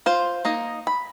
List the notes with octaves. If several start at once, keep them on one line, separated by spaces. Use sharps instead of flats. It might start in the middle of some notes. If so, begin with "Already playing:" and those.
F4 C5 F5
A#3 D#4 D#5
B5